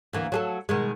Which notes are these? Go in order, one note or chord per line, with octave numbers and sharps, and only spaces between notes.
D2 E3 A#3
F#3 G#4 A4
B2 D#3 G#3